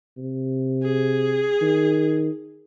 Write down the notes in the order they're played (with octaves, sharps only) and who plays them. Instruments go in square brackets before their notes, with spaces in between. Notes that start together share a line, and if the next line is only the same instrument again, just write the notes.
[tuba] C3
[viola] G#4
[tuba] D#3